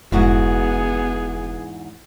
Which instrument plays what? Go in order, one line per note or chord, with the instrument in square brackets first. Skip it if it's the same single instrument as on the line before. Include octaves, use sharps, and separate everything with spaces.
[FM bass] F1 [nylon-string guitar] E2 G#2 F#4 [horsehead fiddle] B3 G#4